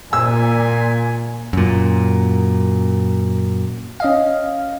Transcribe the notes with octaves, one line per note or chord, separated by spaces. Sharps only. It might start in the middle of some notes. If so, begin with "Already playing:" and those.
A#2 G#5 E6
F#2 A#2
C#4 D#5 F5